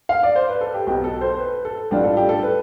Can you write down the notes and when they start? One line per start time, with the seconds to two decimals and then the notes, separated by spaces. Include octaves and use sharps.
0.09 F5
0.23 D5
0.35 C5
0.49 B4
0.61 A4
0.74 G4
0.87 B1 B2 B3 G4
1.04 A4
1.21 C5
1.35 C5
1.39 B4
1.65 A4
1.91 A1 A2 G3 D4 F4 G4
2.04 A4
2.17 G4
2.29 A4
2.43 B4